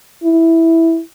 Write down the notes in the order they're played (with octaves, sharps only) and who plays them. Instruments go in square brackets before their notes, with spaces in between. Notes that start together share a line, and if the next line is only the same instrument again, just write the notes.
[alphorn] E4